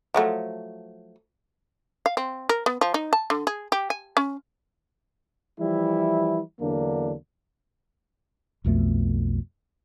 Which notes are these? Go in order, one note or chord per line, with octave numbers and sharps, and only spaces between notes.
F3 F#3 A3
F5
C4
A#4
B3
F3
D#4
A5
D3
G#4
G4
G#5
C#4
E3 F3 G3 E4
E2 D3 F#3 A#3 D4
B1 F2 B2 A3